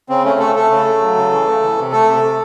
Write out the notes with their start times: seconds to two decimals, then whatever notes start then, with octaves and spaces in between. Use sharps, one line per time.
0.09 C#3 C4
0.25 A3 C#4
0.39 A3 A4
0.56 A3 A4
0.70 C#3
0.85 A3
1.01 F#3
1.16 C#3
1.32 E3
1.48 A3
1.63 E3
1.78 C3
1.92 A3 A4
2.08 C3
2.23 C3